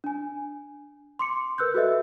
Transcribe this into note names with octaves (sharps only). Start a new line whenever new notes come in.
D4 G#5
C6 D6 C#7
A#4 B4 E6 F#6 G6
F#4 A4 B4 D#5 E5